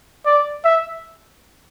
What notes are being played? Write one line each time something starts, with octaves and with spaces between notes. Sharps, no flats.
D5
E5